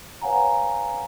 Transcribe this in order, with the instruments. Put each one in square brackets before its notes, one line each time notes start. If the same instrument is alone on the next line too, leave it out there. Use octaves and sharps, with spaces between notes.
[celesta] B4 C#5 F5 F#5 G#5 A#5